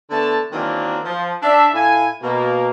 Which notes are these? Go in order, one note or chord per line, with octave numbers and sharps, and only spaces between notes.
D3 A3 B3 A5
D#3 E3 F#3 A#3 C4 D4
F3
D4 E5
A2 E4 F5 G#5
B2 A#3